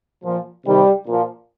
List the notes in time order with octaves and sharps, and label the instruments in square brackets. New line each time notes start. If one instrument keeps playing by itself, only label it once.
[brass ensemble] A#2 F3
C3 D#3 G3
A#2 F3